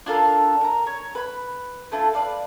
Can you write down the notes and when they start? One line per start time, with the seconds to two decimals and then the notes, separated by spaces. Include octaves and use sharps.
0.06 D4 F4 A4 A#4
0.61 A#4 A#5
0.86 C#5
1.15 B4 B5
1.92 A3 D4 E4 F4
2.13 B4 D5 F5